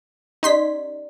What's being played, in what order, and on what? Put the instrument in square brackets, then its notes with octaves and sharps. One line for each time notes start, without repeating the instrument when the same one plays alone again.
[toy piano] C#4 G4 D5 [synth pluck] D#4 C6 B6